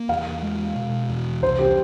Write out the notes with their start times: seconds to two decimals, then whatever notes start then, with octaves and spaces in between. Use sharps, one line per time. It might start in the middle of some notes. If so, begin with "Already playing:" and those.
Already playing: A#3
0.09 E2 F5
0.42 G#3
0.76 B2
1.09 E2
1.42 C2 C5
1.59 G4